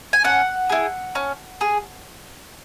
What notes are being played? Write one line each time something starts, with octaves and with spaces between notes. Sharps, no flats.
G#5
C#4 F#5
E4 G#4
C#4
G#4